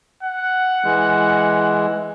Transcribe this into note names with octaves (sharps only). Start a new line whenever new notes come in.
F#5
E3 G#3